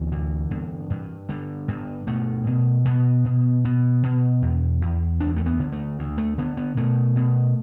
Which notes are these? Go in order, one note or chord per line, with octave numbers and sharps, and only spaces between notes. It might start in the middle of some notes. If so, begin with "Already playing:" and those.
Already playing: D2 E3
D3
G2
G2
D3 G3
G2
B2 A3
B2
B2 B3
B2
B2 B3
B2
E2
E2
D2 D4
A3
B3
D3
A3
D2
A3
D3 B3
B3
B2 A3
B2